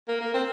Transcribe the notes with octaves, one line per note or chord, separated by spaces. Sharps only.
A#3
A#3
C4